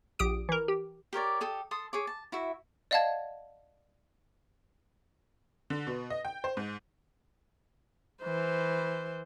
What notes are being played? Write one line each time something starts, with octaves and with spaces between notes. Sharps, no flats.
A#1 G4 D#6 D7
E3 A#4
G4
G4 A#4 C#5 D5
G4 A4 D#6
A4 A5 C6 D#6
G#4 C#5 D6
A5
E4 F#4 E5
D5 D#5 F5 F#5 A5 G#6
D3
B2
D#5
G5
C5
G#2
E3 C5